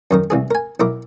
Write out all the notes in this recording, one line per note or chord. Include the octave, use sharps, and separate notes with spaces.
F#2 D#3 A#4
C2 E3 G#4
A#4 G#5
B1 E4 A#4 D6